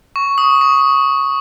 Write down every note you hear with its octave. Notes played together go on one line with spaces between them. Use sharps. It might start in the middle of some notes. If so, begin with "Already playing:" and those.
C#6
D#6
C#6